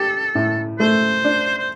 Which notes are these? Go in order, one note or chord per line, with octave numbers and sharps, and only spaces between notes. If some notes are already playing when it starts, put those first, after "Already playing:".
Already playing: G4 A4
A2
A3 C5
D4
C5